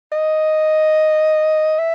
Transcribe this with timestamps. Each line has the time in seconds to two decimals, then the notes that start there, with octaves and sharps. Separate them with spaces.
0.12 D#5
1.79 E5